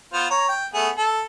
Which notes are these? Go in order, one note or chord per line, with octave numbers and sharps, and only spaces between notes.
B3 F4 C5
C#5 A#5
G5
A3 B3 G#4
A4